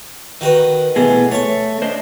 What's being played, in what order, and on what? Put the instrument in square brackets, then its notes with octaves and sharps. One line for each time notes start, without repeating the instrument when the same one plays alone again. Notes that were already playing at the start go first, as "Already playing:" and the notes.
[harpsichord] D#3 F#4 B4
[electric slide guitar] B2 A3 G#4 [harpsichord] E3
[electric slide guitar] A3 [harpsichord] C#5 C#6
[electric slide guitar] D4 C5 D#5